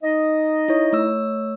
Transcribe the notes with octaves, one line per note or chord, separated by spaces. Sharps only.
D#4 D#5
E4 C#5
A3 C#5 E6